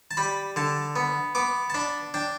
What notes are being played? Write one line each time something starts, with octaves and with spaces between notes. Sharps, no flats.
A5
G3 B5
D3 A5
B3
B3 D6
A5
D4 B5
D4 G5